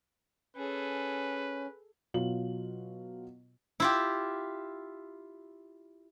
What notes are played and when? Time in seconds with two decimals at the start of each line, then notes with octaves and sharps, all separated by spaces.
0.56 C#4 G#4 A4 B4
2.14 B2 F#3 F4 F#7
3.80 E4 F4 G4